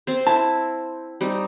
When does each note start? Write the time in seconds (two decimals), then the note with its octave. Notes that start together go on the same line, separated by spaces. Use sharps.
0.07 C4 C5
0.27 E4 A5
1.21 G3 C4 D#4